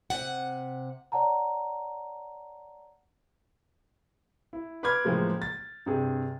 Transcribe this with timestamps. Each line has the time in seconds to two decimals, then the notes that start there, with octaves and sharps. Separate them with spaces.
0.10 C3 F#5
1.12 C#5 D5 F#5 A5 A#5
4.53 E4
4.83 B4 B5 C6 D6 F6 G#6
5.04 A2 C#3 E3 F3 G#3 A#3
5.42 A6
5.86 G2 C3 G#4